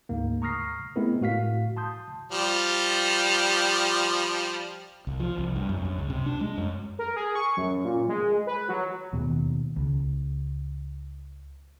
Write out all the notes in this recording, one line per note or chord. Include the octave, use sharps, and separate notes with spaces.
D2 G#2 A#3
A#5 C#6 D#6 F6 A#6 C7
G#3 A3 B3 C4 E4 A#4
A2 F#4 F5 B6
A5 C6 D#6 G6
F3 G3
C2
F3
C2
G2
F#2
F#2
C#2
C3
D4
G#3
F#2
A#4
G#4
C#6
F#2
A#2
G#3
B4
F#3
D#2 B2
C#2